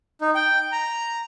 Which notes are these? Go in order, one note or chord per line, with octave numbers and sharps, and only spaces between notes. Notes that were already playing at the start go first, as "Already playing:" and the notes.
D#4
G5
A#5